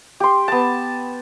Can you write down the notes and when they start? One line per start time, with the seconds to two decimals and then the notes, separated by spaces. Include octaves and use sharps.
0.20 G4 C6
0.48 B3 A5